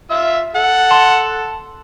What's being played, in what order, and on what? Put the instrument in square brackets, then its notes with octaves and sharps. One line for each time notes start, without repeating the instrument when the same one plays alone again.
[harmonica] F4 E5 E6
[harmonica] A4 [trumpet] F#5
[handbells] A5 [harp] C6